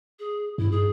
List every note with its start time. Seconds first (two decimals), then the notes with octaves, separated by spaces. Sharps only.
0.19 G#4
0.58 G2 E4
0.72 G#4